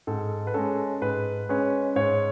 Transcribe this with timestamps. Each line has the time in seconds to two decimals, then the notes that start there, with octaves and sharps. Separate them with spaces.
0.07 G#2 A4
0.47 B4
0.54 G#3 C#4 A4
1.02 G#2 B4
1.49 G#3 C#4 B4
1.96 G#2 C#5